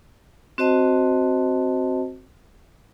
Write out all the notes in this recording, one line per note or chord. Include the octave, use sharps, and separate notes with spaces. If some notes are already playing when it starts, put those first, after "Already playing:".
C4 F#4 C5 D#5 A5